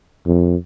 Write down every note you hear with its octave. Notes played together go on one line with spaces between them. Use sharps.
F2